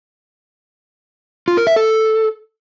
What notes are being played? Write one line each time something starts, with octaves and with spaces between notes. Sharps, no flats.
F4
A#4
E5
A4